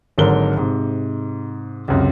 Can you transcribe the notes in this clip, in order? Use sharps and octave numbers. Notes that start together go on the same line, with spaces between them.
G#1 G#2 D3 F#3 A#4 G7
G#2 C3
C#2 F#2 C3